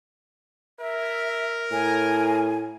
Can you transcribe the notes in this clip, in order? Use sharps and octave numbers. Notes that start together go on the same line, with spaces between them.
A#4 E5
A2 G#5